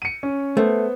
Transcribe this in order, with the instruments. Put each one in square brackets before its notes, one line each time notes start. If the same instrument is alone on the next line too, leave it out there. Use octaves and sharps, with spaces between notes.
[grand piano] C#7 D#7
C#4
[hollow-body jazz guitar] A3 [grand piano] B3 C5